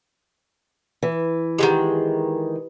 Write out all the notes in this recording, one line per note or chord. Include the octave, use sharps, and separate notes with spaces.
E3
D#3 F3 G#3 G4 F#5